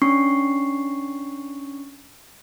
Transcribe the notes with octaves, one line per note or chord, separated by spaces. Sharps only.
C#4 D4 C#6 C7